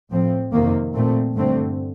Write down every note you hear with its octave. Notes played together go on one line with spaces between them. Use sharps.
A2 F3 C4
F2 C3 D#3 A#3
A#2 A3 C4
G2 D3 A3 C4